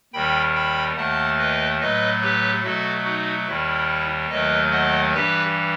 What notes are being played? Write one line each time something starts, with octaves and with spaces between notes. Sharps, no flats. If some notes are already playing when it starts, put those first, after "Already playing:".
D#2 D#3 G3 G5 B5
G5 B5
D#2 D#3 A3 F#5 A5
B4 D#5
A2 F#3 A3 B4 D#5
G4 B4
B2 F#3 A3 F#4 A4
D#4 F#4
D#2 D#3 G3 E4
D#2 D#3 F#3 A3 B4 D#5
D#5 F#5
G2 E3 G3 G4 B4